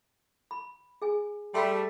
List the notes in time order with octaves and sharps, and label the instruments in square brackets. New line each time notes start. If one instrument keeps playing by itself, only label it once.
[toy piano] B5
G#4 G#5
[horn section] G3 A3 [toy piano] A5 B5 C6